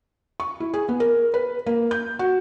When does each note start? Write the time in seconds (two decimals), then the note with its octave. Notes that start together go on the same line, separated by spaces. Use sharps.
0.40 C#6
0.60 E4
0.74 G#4
0.89 B3
1.00 A#4
1.34 B4
1.66 A#3
1.91 G6
2.19 F#4